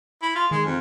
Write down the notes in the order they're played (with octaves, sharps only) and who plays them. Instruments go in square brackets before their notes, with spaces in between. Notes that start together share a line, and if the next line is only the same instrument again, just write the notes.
[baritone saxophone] E4
F4
[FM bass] D#3 [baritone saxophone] G#3
[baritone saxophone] F2